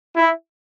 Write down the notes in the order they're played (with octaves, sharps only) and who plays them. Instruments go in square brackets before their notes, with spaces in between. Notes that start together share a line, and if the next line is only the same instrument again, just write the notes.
[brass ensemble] E4